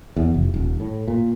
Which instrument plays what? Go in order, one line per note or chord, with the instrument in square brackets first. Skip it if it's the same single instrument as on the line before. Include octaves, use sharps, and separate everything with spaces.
[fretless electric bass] E2
F1
D#1
A2
A#2